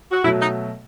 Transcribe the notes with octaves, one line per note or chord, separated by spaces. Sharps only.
F#4
B2 F#3 A3 E4
D#4